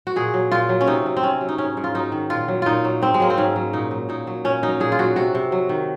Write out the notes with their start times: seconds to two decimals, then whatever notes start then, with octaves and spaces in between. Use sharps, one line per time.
0.07 F#4
0.16 A#2 G#4
0.34 F#3
0.51 A#2 F4
0.69 F#3
0.81 C#4
0.87 C3 D#4
1.06 F#3
1.17 C4
1.23 C3 C#4
1.41 F#3
1.49 D#4
1.58 G#2 C#4
1.77 G#2
1.84 F4
1.95 F#3 D#4
2.12 D#3
2.30 A#2 F4
2.48 F#3
2.62 A#2 D#4 F4
2.84 F#3
3.02 G#2 C4
3.14 G#3
3.20 F#3 A#3
3.30 C4
3.37 G#2 C#4
3.56 F#3
3.73 A#2 D#4
3.91 F#3
4.09 A#2 D#4
4.27 F#3
4.44 A#2 C#4
4.63 F#3 D#4
4.80 A#2 G#4
4.92 F4
4.99 F#3 F#4
5.16 C3 F#4
5.35 C3
5.52 F#3
5.69 D#3